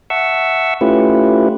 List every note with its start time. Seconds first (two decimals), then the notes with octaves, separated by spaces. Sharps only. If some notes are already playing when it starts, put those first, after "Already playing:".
0.10 E5 F#5 A5 C#6 E6
0.81 A3 C#4 E4 F4 G4 B4